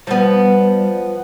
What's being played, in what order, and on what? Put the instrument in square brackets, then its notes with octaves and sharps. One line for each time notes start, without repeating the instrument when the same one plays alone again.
[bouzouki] F3 B3 [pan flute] G3